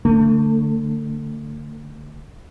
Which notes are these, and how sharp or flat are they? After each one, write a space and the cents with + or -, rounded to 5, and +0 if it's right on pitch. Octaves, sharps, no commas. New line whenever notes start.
D3 +0 A3 +30